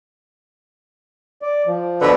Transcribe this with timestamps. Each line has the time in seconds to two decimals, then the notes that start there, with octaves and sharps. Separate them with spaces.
1.42 D5
1.67 F3
2.01 B2 D3 B4